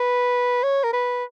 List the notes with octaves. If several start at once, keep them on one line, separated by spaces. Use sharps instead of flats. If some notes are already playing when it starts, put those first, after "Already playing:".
Already playing: B4
C#5
A#4
B4